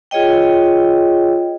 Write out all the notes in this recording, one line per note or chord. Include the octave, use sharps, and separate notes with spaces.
F4 G#4 C#5 D#5 G5